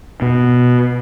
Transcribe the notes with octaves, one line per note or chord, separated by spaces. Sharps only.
B2